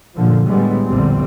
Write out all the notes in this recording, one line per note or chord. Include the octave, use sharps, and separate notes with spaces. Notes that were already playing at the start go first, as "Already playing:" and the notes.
F#2 A#2 D3 F3
A2 D3 G3 G#3 B3
A#1 E2 D3 G3 C4